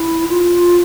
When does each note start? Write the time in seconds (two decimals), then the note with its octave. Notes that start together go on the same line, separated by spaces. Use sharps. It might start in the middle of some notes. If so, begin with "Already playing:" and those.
Already playing: E4
0.29 F4